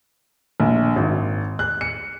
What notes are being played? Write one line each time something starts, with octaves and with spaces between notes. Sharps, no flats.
A#1
G#1
F#6
C#7